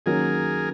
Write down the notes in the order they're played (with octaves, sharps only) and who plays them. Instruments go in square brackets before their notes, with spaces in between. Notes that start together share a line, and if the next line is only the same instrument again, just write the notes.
[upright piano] D#3 F#3 A#3 C#4 [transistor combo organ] G#4 A#4